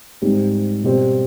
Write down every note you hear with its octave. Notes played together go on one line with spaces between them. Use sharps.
G#2 G3 C4 G4
B2 G3 C4 G4